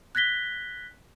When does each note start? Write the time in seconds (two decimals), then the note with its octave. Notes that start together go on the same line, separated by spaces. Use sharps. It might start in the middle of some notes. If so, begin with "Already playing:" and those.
0.15 F#6 G#6 A#6 B6 G7